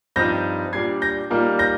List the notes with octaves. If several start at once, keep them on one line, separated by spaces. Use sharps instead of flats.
G2 F3 C4 D#4 G6 A#6
A#2 G3 D4 G#6 C7
G6 A#6
A#2 G3 A#3 D#4
G6 A#6